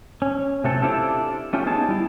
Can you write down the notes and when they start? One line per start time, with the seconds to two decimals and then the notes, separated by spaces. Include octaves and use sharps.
0.22 C#4
0.64 C3 F#3 A3 C4 A4
0.82 C4 D4 E4 F4 G4 A4
1.53 A3 C#4 F4 G4
1.66 B3 D#4 G#4 A5
1.89 G3 E4